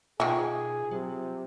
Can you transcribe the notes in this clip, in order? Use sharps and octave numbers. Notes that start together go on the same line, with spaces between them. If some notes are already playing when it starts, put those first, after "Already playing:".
B2 D#3 F4 F#4 G#4
C3 F#3